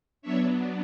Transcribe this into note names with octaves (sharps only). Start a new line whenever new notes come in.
F#3 B3 D4 C#5 E5